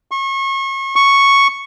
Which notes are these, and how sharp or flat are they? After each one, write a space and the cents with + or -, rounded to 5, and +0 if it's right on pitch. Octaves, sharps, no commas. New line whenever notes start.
C#6 -35
C#6 +0